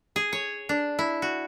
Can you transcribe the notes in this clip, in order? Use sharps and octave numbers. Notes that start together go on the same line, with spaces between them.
G#4
C#5
D4
E4
F#4